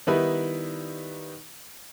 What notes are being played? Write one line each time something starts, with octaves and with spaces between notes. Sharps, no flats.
D#3 G3 B3 D#4 E4 B4